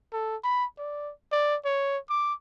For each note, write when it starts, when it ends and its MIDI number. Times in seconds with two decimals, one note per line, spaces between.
0.13 0.36 69
0.44 0.65 83
0.78 1.12 74
1.32 1.56 74
1.65 1.98 73
2.10 2.34 86